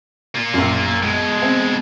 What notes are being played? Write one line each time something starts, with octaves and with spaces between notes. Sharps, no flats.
A#3 F4
A#1 F#2
B2 G#3
C4